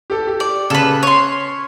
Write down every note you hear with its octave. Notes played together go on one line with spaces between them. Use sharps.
G4 A4
G4
D5
C#3 A4 B4
C#5 C6